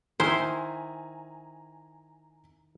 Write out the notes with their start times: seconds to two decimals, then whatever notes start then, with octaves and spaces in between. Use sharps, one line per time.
0.20 D#3 E4 C5 G#5 A#5